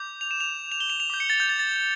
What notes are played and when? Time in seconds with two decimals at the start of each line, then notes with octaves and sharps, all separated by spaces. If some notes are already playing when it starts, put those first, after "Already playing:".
Already playing: D6 G6
0.21 F7
0.31 E7
0.40 F7
0.72 F7
0.80 G7
0.90 F7
1.00 F7
1.10 D6 G6
1.20 C#7
1.30 A6
1.40 G6
1.49 A6
1.59 A6